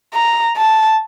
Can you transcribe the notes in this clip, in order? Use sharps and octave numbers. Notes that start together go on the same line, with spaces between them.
A#5
A5